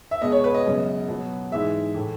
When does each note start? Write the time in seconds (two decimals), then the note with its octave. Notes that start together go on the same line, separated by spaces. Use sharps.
0.11 E5
0.21 B2 G#3 B3 D#5
0.32 C#5
0.44 B4
0.54 D#5
0.65 F#2 C#3 G#3 B3
1.08 B2 F#3 B3
1.52 G#2 E3 G#3 E5
1.94 A2 E3 A3